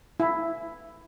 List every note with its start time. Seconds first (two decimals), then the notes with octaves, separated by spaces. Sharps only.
0.20 E4